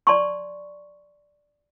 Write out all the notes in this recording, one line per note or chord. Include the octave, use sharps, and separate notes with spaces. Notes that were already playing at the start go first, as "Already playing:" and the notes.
D5 A5 C6 C#6